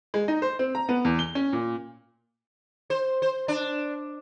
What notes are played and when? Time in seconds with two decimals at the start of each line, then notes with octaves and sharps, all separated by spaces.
0.14 G#3
0.28 D#4
0.42 C5
0.59 C4
0.75 A#5
0.89 B3
1.05 E2
1.19 G7
1.35 C#4
1.53 A#2
2.90 C5
3.22 C5
3.48 D4